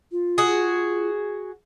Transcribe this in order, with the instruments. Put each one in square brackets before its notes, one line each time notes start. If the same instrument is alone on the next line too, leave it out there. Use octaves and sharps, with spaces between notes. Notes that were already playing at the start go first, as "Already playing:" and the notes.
[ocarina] F4
[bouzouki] F#4 G#4